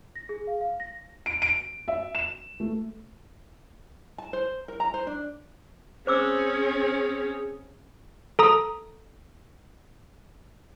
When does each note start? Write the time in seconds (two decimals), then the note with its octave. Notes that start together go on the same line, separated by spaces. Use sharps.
0.15 A#6
0.29 G#4
0.47 F5
0.61 F5
0.80 A#6
1.26 D7
1.42 D7
1.88 E5
2.15 E7
2.60 A3
4.18 A5
4.33 C5
4.68 A#4
4.80 A#5
4.94 C5
5.07 D4
6.07 C4 C#4 G#4 C5 D6 E6
8.39 A4 A#5 D#6